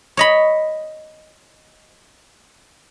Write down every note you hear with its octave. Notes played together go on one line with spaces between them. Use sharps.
C#5 D#5 B5